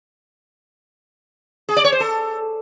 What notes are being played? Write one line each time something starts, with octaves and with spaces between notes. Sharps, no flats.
G#4
D5
C#5
C5
A4